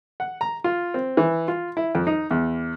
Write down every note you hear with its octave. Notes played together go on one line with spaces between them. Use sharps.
F#5
A#5
F4
C4
E3
F4
E4
F2
D#4
E2